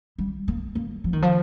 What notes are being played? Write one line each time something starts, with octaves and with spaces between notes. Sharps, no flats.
G3
A#3
A#3
F3
D#3
F3